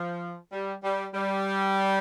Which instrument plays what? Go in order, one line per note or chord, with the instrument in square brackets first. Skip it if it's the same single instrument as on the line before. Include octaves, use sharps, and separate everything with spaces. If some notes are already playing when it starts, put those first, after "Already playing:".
Already playing: [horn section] F3
G3
G3
G3